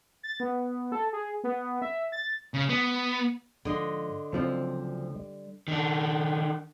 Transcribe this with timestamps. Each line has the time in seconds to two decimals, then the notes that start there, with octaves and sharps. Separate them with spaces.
0.23 A6
0.40 B3
0.92 A4
1.12 G#4
1.44 B3
1.82 E5
2.12 A6
2.54 C#3
2.69 B3
3.65 G#2 D3 F3 D#5 C6
4.33 D2 C#3 F3 F#3 C4
5.16 G3
5.68 D#3 D4